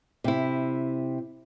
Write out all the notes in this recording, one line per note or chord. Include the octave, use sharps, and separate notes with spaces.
C3 E4